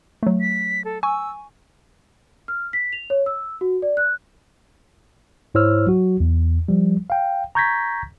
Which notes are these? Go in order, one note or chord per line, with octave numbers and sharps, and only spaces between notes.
F#3 A3
B6
A4
G#5 C#6 E6
F6
B6
F7
C#5
E6
F#4
D5
F#6
G#2 E4 C5 C#5 E6 F6
F#3 F#4
E2
F3 G3
F5 G5
A#5 C#6 G6 G#6 A#6 B6